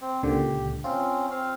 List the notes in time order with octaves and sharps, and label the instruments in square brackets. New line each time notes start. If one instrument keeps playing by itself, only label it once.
[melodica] C4
[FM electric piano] C#2 A#2 D3 [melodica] G4
[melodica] C4 C#4 [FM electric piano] F4
[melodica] C4 F5